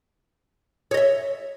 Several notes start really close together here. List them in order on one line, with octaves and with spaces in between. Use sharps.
C#5 D#5 E5